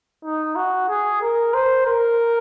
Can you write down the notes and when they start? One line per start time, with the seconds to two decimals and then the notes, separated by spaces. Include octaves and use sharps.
0.24 D#4
0.56 F#4
0.89 G#4
1.22 A#4
1.54 C5
1.86 A#4